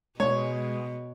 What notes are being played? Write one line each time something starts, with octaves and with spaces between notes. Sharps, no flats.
B2 G#3 C#5